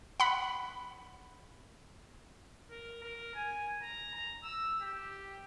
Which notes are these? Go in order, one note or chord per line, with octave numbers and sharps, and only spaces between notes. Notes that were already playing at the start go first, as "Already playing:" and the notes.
F#5 B5
A#4
A#4
G#5
A#5
A#5
E6
G4